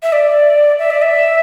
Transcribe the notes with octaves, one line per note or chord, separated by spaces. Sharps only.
E5
D5
E5
D5
E5